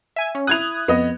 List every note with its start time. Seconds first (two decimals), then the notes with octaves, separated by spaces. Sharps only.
0.16 E5 G#5
0.35 C#4
0.47 E4 D#6 F#6 G#6 F7
0.88 F2 B3 D#5